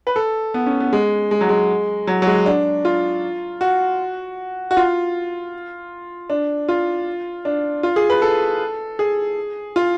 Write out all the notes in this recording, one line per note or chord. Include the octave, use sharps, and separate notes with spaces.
B4
A4
B3
C#4
B3
G#3
G#3
F#3
G#3
F#3
F#3
G#3
D4
F4
F#4
F#4
F4
D4
F4
D4
F4
G#4
B4
A4
G#4
F4